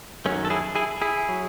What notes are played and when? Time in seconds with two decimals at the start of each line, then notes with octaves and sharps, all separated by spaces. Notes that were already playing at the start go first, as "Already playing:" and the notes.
0.25 F#2 D#3 F#3 A3 C#4
0.45 A4
0.50 E4 G#4
0.76 E4 G#4
1.02 E4 G#4
1.29 F#3